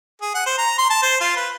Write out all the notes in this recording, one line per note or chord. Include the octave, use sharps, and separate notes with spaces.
G#4
F#5
C5
A#5
C6
A5
C5
F4
B4